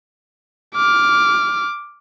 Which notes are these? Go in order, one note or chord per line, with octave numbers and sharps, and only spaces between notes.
D6 F6